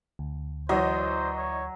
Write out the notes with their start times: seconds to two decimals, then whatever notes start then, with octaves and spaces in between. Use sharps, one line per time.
0.19 D2
0.69 E3 F#3 C5 D5 D#5
1.38 C#5